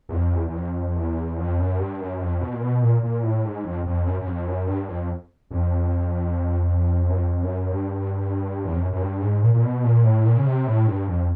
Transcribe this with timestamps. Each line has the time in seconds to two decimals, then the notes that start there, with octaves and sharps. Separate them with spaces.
0.09 E2
0.13 F2
0.35 E2
0.47 E2
0.55 F2
0.96 E2
1.38 F2
1.58 F#2
1.79 G2
2.00 F#2
2.21 F2
2.41 B2
2.53 A#2
2.61 B2
2.82 A#2
3.03 A#2
3.23 A2
3.45 G#2
3.64 F2
3.86 F2
4.07 F#2
4.20 F#2
4.27 F2
4.47 F#2
4.67 G2
4.88 F2
5.51 F2
7.09 F#2
7.16 F2
7.43 F#2
7.71 G2
8.65 E2
8.73 F2
8.81 F#2
8.92 F#2
9.01 G2
9.22 G#2
9.43 A#2
9.54 A#2
9.63 B2
9.84 A#2
10.04 A2
10.25 A#2
10.37 C#3
10.46 C3
10.67 A2
10.87 G2
11.07 F2